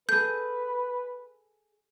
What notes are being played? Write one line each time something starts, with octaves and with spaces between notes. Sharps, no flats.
G#4 A4 B4 G6